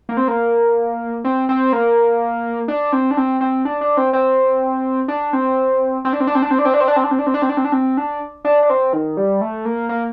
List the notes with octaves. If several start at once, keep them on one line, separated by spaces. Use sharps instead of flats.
A#3
C4
A#3
C4
C4
A#3
D4
C4
D4
C4
C4
D4
D4
C4
C4
D4
C4
C4
D4
C4
D4
C4
D4
C4
D4
C4
D4
C4
D4
C4
D4
C4
D4
C4
D4
C4
D4
C4
D4
C4
D4
D4
D4
C4
D#3
G3
A3
A#3
A#3